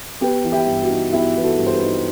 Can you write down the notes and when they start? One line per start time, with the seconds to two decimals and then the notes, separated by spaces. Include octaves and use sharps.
0.21 B3 G4 B4
0.44 E3
0.52 E4 G4
0.67 G2
0.83 F#4
0.90 D#4
1.12 B3 E4 G4
1.35 E3 B4
1.43 F#4 A4
1.59 G2
1.66 C5
1.73 G4 B4
1.81 D#4